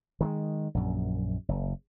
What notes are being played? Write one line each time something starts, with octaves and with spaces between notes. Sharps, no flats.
D#3 G3 G#3
A#1 F#2
F#1